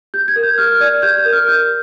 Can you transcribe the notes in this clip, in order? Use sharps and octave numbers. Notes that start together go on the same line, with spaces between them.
G4 G6
G#6
A#4
G6
G4 F6
D5 G#6
G4 G6
G6
A#4
F6
G4 G6